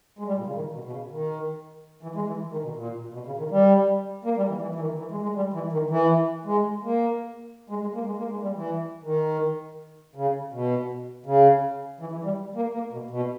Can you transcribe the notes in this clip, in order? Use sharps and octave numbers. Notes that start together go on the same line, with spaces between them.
G#3
G3
A#2
C#3
D#3
B2
B2
C#3
D#3
E3
G#3
E3
D#3
B2
A#2
B2
C#3
D#3
G3
A#3
G3
E3
E3
E3
D#3
E3
G#3
G#3
G3
E3
D#3
E3
G#3
A#3
G#3
G#3
A#3
G#3
A#3
G#3
G3
E3
D#3
C#3
B2
C#3
E3
E3
G3
A#3
A#3
B2
B2